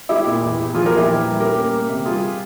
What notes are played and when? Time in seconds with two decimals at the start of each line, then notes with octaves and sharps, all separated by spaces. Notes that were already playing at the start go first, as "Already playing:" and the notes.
0.09 G#3 E4 G4
0.27 A#2
0.43 E2
0.58 E2
0.74 F3 F4 G#4
0.85 G4 A#4
0.92 A#2
0.97 E4 G4
1.07 E3
1.23 G3
1.40 C#4 G4 A#4
1.56 A#3
1.73 A#3
1.89 C3
2.05 G3 F4 G#4